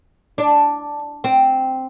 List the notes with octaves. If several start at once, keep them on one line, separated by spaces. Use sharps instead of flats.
D4
C4